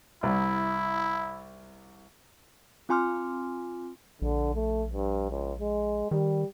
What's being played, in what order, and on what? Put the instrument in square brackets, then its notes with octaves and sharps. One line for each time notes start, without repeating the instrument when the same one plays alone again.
[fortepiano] C2 [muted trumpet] E4
[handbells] C4 F4 G#5 C6 D6 F6
[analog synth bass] A#1 [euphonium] D3
[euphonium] A3
G2
C#2
G#3
[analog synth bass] D#3 [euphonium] G3